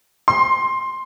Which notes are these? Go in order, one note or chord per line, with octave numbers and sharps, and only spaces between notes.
C6